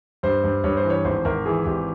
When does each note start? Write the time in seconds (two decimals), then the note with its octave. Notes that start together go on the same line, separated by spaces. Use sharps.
0.23 G2 C5
0.44 G2
0.64 G2 C#5
0.77 C5
0.84 E3
0.90 C#5
1.05 G#1 C5
1.25 G#1 A#4
1.46 E3 G#4
1.66 G#1 G4